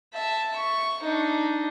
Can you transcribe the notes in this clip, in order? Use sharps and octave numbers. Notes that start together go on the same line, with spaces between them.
E5 A5
C#6
D4 D#4